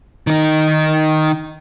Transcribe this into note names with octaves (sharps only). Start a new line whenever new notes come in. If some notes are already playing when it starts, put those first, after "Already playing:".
D#3 D#4